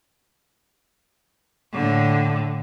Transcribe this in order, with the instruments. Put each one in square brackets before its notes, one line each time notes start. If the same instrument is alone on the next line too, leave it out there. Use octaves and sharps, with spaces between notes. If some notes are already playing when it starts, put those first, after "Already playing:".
[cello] A2 D3